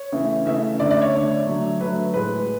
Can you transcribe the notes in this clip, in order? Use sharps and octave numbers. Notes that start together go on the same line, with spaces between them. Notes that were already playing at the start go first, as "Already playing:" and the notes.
Already playing: C#5
C#3 E3 A3
C#3 E3 A3 E5
D3 A3 D5
D5
C#5
D3 A3
D3 F#3 A3
D3 F#3 A3 B4
A2 G#3 B4